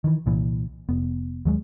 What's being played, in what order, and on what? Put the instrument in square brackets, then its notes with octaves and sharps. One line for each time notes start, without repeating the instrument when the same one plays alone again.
[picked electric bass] D#3 E3
C2 A#2 E3
F1 B3
D#2 F#3 G#3